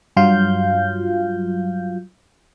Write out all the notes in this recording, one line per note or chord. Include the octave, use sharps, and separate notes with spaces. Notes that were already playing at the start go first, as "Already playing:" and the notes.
G2 F#3 F4 F5 G6